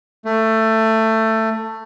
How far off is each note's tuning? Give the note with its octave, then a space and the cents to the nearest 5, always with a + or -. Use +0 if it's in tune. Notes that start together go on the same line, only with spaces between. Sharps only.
A3 +15